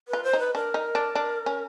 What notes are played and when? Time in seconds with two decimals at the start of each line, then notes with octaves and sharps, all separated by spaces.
0.08 B4
0.13 F4
0.23 C5
0.33 D#4
0.39 B4
0.54 D4 A#4
0.74 D#4
0.95 D4
1.15 D4
1.46 C#4